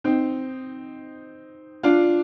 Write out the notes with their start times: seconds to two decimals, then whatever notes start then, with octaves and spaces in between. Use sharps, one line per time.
0.04 C4 D#4
1.83 D4 F4